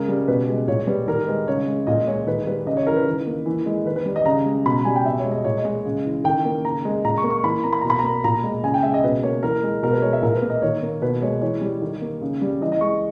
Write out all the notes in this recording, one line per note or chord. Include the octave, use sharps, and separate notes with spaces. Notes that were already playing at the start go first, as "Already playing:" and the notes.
Already playing: C#3 G#3 A#4
G3
B2 B4
G#3
A#2 C#5
G3 B4
D#3 A#4
G#3 B4
C#3 C#5
G#3
A#2 D#5
G#3 C#5
D#3 B4
G3 B4
C#3 D#5
C#5
E3 A#4
B4
D#3
A#3
E3
G#3
D#3 B4
B4
G3
D#5
C#3 A#5
G#3
B2 B5
A#5
G3 G#5
G5
B2 E5
C#5
G#3
D#5
A#2 C#5
D#5
G#3
C#3
E3
D#3 G5
A#3
C#3 A#5
G#3
A#2 A#5
C#6
A#3
C#6
E3 B5
A#3 A#5
B5
B2 A#5
B5
A#3 A#5
A#2 A#5
G#3
C#3 G#5
G5
G#3 E5
D#5
B2 B4
A#3 C#5
E3 A#4
G#3
B2 A#4
B4
G#3 C#5
E5
A#2 A#4
B4
A#3
D#5
D#3 C#5
A#3
B2 B4
G#3 C#5
E3 C#5
G3
D#3
A#3
C#3
G3
E3 D#5
D#5
G#3 C#6